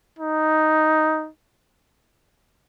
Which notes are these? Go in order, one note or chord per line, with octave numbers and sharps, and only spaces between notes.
D#4